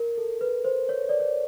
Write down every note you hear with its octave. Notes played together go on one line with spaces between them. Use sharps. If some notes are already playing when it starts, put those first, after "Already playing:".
Already playing: A#4
A4
B4
C5
C#5
D5
C#5